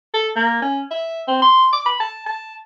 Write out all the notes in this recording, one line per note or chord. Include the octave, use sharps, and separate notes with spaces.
A4
A#3
C#4
E5
C4
C6
D6
B5
A5
A5